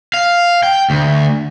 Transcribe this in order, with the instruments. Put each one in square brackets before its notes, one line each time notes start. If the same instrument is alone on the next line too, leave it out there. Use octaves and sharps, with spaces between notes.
[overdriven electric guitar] F5
G5
D2